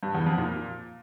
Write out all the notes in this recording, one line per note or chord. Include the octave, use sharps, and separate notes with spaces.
G2
E2
F2
A#2